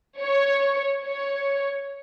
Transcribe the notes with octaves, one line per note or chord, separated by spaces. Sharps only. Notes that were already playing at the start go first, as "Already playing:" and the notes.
C#5
C#5